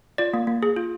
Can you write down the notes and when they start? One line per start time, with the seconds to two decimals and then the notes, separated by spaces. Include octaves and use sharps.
0.18 F4 D5
0.34 A#3
0.47 A#3
0.63 G#4
0.76 F4